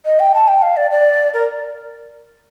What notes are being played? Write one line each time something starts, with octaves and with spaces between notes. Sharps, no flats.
D#5
G5
A5
G5
F5
D5
D5
A#4